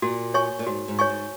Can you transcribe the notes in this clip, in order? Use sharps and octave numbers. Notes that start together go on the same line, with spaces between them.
A#2 F#4
C#5 G#5 C#6
A#2
G#2 F#4
G#2
C#5 G#5 C#6
G#2